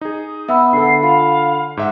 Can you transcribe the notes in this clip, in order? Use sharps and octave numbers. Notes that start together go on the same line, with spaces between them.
D#4 G#4 D#6
B3 E5 F#5 B5 E6
D3 A4 C7
F4 F5 B5
G#2 E5 F#5